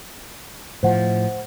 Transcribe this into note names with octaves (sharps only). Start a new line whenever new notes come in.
A2 F3 C5 F#5